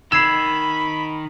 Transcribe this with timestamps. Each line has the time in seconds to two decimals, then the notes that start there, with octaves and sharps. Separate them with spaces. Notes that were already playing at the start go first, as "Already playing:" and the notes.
0.12 D#3 B5 E6 G#6 C7 E7